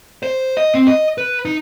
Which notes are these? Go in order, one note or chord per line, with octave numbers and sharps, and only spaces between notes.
C5
D#5
C4
D#5
B4
D#4